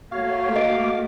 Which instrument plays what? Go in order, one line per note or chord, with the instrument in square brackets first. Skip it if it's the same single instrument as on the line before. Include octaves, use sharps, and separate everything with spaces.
[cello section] A3 A#3 [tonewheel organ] F#4 C#5 [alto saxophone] F5
[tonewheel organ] F#4 D6 [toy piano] D#5